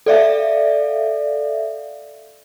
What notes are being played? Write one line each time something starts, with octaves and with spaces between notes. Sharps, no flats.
A4 D5 E5 F5